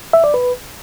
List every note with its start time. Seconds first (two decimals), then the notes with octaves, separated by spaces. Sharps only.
0.13 E5
0.24 D5
0.34 B4